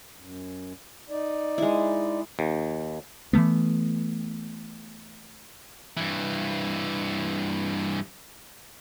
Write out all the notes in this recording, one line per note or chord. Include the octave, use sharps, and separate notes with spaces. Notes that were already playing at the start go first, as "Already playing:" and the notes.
F#2
D#4 D5
G#3 E4
D#2
E3 F3 A3 B3
G2 E3